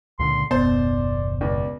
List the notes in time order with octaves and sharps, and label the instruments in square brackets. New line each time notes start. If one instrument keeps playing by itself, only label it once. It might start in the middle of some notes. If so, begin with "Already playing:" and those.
[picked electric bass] C#2 A#2 D3 [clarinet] C6
[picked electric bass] F#1 D#2 B2 [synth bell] B3 [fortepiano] C5 [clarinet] D5
[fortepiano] C#2 [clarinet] D5